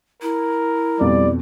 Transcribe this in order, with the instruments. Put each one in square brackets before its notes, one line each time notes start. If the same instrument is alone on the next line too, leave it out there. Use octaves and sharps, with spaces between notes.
[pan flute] E4 [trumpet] A#4
[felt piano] F2 B2 [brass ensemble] G3 D5